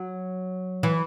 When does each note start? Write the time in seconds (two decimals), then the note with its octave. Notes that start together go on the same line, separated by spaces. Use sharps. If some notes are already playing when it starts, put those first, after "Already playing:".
Already playing: F#3
0.83 E3